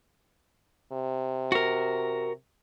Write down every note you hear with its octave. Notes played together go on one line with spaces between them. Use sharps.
C3
F#4 A#4